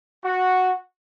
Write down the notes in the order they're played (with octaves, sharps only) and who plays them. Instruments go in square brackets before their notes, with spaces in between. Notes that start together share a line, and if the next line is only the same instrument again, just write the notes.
[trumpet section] F#4